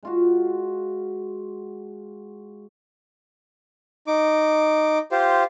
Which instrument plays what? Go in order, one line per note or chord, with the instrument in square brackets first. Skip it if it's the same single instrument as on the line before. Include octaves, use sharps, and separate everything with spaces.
[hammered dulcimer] G#3 F4 F#4
[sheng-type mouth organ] D#4 D6
F4 G4 C5